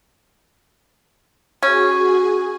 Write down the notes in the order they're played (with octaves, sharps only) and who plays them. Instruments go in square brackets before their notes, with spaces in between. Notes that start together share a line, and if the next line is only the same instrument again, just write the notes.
[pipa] C#4 [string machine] F#4 G#4 G#5